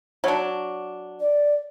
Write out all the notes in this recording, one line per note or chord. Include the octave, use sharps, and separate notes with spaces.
F#3 D4
D5